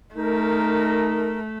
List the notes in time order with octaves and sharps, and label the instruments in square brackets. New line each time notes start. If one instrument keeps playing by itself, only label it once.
[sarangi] A3 [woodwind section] D#4 A#4